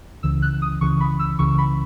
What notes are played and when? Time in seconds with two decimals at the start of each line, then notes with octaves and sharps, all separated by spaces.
0.23 C#2 C#3 E3 E6
0.42 F#6
0.62 D#6
0.81 C#2 C#3 E3 C#6
1.00 B5
1.19 E6
1.39 C#2 C#3 E3 C#6
1.58 B5